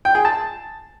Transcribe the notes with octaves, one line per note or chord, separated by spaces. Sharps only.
G5
G#4
A5